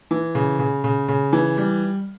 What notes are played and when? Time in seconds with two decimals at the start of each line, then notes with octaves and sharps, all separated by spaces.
0.11 E3
0.35 C#3
0.59 C#3
0.84 C#3
1.08 C#3
1.33 E3
1.57 G3